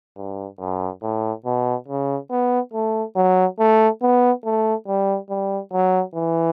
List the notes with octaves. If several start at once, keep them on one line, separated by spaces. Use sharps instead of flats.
G2
F#2
A2
B2
C#3
B3
A3
F#3
A3
B3
A3
G3
G3
F#3
E3